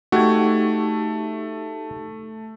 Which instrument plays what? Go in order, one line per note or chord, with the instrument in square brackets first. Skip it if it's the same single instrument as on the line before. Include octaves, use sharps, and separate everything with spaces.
[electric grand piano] A3 [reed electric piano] D#4 G4 G#6 [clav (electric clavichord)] F#4